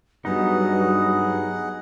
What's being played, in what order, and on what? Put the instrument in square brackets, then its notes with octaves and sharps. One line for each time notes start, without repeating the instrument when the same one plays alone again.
[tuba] G2 [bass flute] F#3 [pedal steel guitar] B3 D#4 [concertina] G#4 D#5 F#5